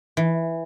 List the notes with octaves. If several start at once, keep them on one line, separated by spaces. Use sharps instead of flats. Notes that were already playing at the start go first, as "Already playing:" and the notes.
E3